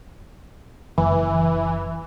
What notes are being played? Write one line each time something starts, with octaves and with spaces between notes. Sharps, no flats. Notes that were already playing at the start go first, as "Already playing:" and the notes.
F#1 E3